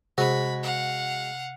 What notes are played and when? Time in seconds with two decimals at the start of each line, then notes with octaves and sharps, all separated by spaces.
0.18 C3 G#3 F#4 B5
0.63 F5 F#5